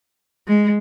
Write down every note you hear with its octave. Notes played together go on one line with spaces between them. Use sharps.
G#3